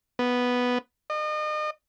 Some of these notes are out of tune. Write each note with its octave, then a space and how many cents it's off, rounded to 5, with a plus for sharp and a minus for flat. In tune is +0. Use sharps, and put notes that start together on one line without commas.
B3 +0
D#5 -35